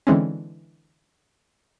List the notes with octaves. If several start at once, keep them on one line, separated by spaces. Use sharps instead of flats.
D3 E3 G#3 C4 C#4